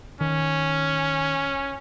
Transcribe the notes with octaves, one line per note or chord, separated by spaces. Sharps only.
D#3 C#4